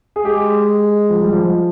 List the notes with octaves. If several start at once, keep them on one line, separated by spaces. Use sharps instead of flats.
G#4
G#3 G4
F3
G3
F3